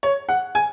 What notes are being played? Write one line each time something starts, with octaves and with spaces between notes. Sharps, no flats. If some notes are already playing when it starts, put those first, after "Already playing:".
C#5
F#5
G#5